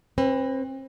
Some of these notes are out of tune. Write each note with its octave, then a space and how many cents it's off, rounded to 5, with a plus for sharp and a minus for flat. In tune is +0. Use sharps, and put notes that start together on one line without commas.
C4 +35 B4 +10